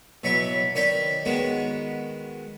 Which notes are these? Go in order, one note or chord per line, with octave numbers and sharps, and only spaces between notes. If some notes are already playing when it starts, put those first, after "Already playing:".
B2 E3 F#3 B5 C#6
D#3 C#5 D5 G5 B5
D#3 G#3 B3 F#4